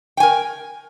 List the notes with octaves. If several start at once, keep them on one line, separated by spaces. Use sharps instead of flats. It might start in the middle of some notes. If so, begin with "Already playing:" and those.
A#4 G5 G#5